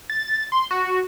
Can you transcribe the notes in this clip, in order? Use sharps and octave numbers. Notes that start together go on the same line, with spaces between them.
A6
C6
F#4